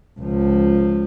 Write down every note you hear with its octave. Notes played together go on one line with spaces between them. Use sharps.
C#2 F3